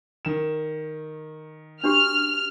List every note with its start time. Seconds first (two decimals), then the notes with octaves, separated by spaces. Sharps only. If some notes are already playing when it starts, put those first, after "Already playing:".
0.25 D#3 E7
1.84 D4 F#4 G4 F6